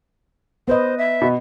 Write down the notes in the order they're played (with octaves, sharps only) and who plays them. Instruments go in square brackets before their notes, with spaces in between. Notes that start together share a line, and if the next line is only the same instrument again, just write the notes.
[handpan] B3 B4 D#5 [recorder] C5
[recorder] E5
[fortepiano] B2